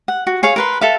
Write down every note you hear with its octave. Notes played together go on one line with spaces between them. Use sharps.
F#5
F#4
G#4 C#5 F5
A#4 B4 C6
A4 E5 F5